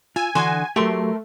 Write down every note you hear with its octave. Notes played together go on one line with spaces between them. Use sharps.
F4 G#5 E6
D3 E3 D4 F#4 G#5 C6 D#6
F#3 A3 G4 A#4 C6